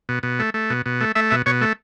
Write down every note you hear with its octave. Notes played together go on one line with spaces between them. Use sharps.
B2
B2
A3
A3
B2
B2
A3
A3 E5
B2 E5
B2 C#5
A3